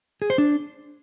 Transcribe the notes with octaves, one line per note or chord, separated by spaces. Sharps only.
G#4
C5
D4